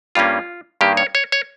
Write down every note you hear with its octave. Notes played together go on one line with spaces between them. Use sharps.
G2 G3 A#3 C#4 F4
G2 D#3 A#3 G4
C#5
C#5
C#5